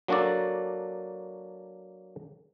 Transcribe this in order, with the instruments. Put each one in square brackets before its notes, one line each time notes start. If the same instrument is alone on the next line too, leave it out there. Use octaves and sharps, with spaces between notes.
[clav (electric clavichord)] F#3 A#3 D4 F#4 A4 D5